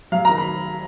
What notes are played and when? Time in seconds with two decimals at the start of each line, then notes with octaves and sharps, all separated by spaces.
0.12 F#3 F5
0.25 A#5
0.29 D#3
0.38 B5